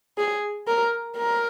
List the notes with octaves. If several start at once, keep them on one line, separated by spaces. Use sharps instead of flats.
G#4
A#4
A#4